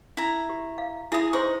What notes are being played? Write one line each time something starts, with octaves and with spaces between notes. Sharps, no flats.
E4 A#5
G4
F5
E4 G#4 E5 B5 D#6
D#4 G#4 C5 C6 C#6 D#6